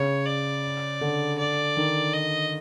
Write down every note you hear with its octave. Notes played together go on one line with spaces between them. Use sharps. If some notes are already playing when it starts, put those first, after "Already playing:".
Already playing: C#3 C#5
D5
D3
D5
D#3
D#5